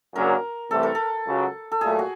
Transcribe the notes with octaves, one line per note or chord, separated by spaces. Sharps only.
F#2 C#3 F#3 A#3 D4 A#4
C2 C3 E3 A3 A4
A#4
A4
C#2 C#3 F#3
A4
A#2 F#3 A3 G#4
F#4